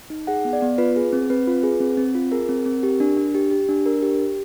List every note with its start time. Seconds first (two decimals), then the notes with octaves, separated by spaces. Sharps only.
0.10 D#4
0.27 G#4 F#5
0.45 B3
0.53 D5
0.62 B3
0.78 F4 B4
0.96 G#4
1.13 C4
1.30 C4 B4
1.47 F4
1.63 G#4
1.80 C4
1.97 C4
2.15 F4
2.32 G#4 A#4
2.49 C4
2.66 C4
2.83 G4
3.00 D4
3.17 D4
3.35 G4
3.52 G4
3.69 D4
3.86 D4 A#4
4.02 G4
4.19 G4